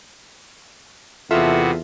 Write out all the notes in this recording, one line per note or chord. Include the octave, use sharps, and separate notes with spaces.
E2 C3 B3 F4 F#4 A4 E5